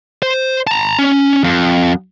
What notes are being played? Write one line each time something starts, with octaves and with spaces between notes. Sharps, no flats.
C5
A5 A#5
C#4
F2